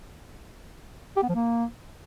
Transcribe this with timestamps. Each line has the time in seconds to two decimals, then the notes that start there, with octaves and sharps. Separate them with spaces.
1.17 G4
1.23 B3
1.29 F3
1.35 A#3